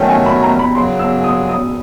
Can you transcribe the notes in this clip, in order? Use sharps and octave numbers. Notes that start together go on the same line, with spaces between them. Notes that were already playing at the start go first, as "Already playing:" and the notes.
Already playing: D#3 F#3 A3 C#4 G5
G#5
B5
A#5
B5
F#2 C#3 F#3 C6
E6
D#6
D#6